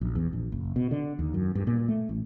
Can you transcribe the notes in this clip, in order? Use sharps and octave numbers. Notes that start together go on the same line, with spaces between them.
A#1
E2
A#1
F#1
B2
D3
D#2
F#2
G2
A#2
A3
A1